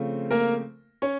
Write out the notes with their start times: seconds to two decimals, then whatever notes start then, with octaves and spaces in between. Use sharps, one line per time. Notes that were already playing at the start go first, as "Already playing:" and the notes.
Already playing: C#3 F3 A3 C4
0.31 A#3 A#4
1.02 C#4 C#5